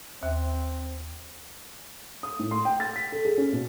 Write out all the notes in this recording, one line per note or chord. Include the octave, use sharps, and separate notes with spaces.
D#2 C4
D#6
A2
C6
G5
A6
B6
A4
G#4
C#4
B2